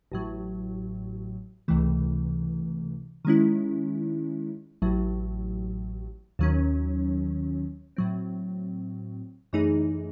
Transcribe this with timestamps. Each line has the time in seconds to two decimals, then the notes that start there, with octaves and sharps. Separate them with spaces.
0.12 A1 A2 F#3
1.68 C#2 C3 E3 A3
3.25 D#3 G#3 C#4 E4
4.82 A1 A2 F#3
6.39 D#2 D#3 F#3 C#4
7.97 A2 F#3 C4
9.53 F#2 E3 A3 D#4 G#4